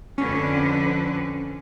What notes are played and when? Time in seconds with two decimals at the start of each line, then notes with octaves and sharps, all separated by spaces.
0.18 F2 D3 C#4 B4